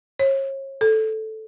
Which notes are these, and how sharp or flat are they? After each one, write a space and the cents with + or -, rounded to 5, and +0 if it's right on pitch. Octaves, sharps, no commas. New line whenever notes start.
C#5 -35
A4 -5